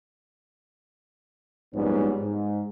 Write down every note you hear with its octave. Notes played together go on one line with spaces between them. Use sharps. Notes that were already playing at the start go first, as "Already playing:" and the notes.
A#1 G#2 G3 B3 C#4
G#2